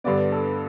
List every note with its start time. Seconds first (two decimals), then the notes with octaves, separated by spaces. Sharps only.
0.04 G2 D3 G3 B3 D5
0.32 A4